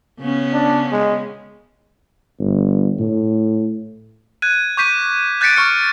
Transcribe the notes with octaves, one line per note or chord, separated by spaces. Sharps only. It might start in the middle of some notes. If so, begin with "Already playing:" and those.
C#3 B3 C#4
D4
G#3
G1
A2
F#6 G#6 D#7
C#6 D6 G6 B6 D#7
F#6 G6 A6 B6 C#7 D7
C#6 F6 C#7